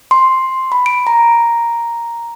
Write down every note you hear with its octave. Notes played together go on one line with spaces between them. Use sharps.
C6
B5
D7
A#5